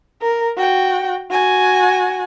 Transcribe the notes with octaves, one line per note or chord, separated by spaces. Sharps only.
A#4
F#4 G5
F#4 G#5